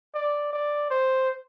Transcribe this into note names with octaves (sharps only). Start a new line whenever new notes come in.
D5
D5
C5